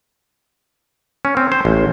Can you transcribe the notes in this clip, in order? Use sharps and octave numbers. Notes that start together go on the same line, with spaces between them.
C#4
C4
C5
A1